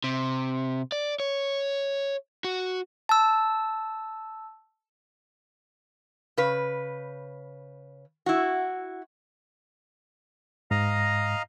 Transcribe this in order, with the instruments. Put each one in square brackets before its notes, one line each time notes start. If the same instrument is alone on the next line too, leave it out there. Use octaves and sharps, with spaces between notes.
[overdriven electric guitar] C3
D5
C#5
F#4
[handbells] A5 E6
[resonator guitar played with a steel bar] C#3 B4
E4 F#4
[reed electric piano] G#2 [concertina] D#5 F5 A#5